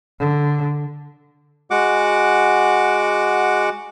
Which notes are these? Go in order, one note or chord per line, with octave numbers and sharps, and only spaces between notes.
D3
G#3 F#4 F#5 D6